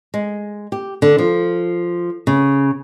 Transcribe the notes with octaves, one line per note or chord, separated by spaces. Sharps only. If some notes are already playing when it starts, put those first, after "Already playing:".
G#3
G4
D3
F3
C#3